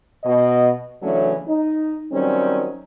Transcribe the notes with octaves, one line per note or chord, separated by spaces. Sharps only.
B2 D#5
C#3 E3 F#3 A3 C#4 D4
D#4
D#3 F#3 G3 C4 C#4